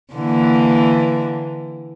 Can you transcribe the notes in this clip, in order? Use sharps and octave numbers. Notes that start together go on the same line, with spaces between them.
D3 E3 A#3